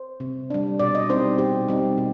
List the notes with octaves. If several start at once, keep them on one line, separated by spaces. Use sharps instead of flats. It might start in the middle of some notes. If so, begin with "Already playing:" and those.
Already playing: C5
C3
G3 D4
B2 D5
D#5
G3 C4 D#4 C5
B2 G4
G3 C4 D#4
B2